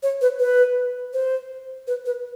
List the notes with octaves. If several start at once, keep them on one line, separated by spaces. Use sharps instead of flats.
C#5
B4
B4
C5
B4
B4